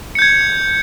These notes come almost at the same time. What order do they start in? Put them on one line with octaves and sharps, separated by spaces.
C#7 G6 G#6